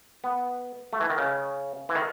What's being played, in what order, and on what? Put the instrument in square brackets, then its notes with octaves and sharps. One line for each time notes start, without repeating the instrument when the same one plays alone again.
[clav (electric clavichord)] B3
A3
E3
D#3
C#3
E3
D#3